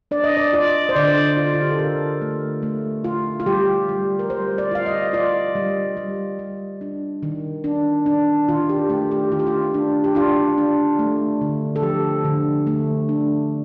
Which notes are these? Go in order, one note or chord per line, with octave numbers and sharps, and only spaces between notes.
D4 D5
D#5
D5
F4 D5
C5
D3 D5
F4
F4
G4
A4
D3 A#4
A3
A3
F4
F4
G3 G4
G3
A#4
G3 C5
D5
F4 F5
D#5
F4 D5
G3
G3
G3
D4
D#3
D4
D4
D#3 F4
G4
A3 G4
G4
D#3 F4
G4
F4
D4
G4
D4 F4
D4
A3
D3
A4
F3 G4
D3
A3
D4